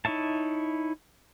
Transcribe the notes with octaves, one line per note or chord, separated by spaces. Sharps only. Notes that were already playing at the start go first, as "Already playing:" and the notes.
D#4 E4 C#5 E5 A5